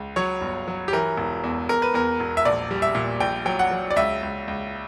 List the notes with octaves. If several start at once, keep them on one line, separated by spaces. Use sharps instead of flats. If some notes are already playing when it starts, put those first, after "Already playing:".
Already playing: C#2
F#3 C#5
G1
F#3
G4
E3 A#4
E1
E2
E2 A#4
B4
E2 A#4
E1
E5
A#1 D5
G3
E5
A#2
A#1 G5
F#3 G5
F#5
F#3
D5
C#2 E5
C#2
C#2